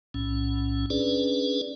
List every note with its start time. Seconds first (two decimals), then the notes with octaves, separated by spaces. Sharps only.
0.14 B1 A2 C#4
0.90 C#4 D4 G#4 B4 D5